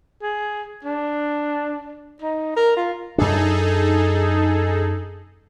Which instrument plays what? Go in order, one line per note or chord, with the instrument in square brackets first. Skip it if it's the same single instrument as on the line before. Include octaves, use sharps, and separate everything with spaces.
[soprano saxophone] G#4
D4
D#4
A#4
F4
[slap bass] F#2 D4 [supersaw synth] D#4 G#4 A4